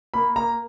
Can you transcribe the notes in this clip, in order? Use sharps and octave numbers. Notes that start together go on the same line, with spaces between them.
A#3 B5
A#3 A#5